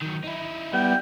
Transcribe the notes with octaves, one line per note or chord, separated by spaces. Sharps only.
D#3 F#3
D#4 E4
G3 B3 G5